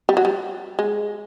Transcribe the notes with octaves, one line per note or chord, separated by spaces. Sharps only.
G3
F#3
G3
G#3